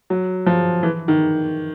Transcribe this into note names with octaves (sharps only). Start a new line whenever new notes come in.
F#3
F3
E3
D#3